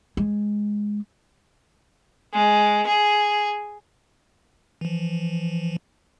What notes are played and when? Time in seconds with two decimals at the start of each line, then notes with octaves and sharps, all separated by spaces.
0.17 G#3
2.34 G#3
2.87 G#4
4.81 E3 F3